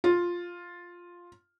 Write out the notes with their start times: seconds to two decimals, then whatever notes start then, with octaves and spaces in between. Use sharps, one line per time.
0.04 F4